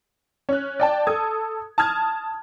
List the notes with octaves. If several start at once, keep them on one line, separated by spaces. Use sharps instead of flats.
C#4 F#6
D5 G5 A5
A4 D#6 G#6
A5 D#6 F6 G#6